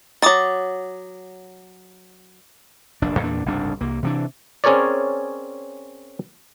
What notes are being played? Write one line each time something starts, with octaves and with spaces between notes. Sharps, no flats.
D#3 F#3 D6 D#6 A6
F1 A#1 D4
E2 A#2 D4
F#1 C2 G#2 D4
C2 A#3
C3 E3 D4
C4 C#4 G#4 A#4 C#5 D5